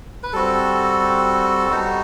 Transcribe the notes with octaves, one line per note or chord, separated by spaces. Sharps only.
B4
G3 C4 F#4 A4
G3 B3 D#4 F#4